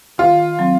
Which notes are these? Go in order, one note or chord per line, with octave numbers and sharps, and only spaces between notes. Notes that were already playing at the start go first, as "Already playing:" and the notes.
D#3 F4
F#3 C4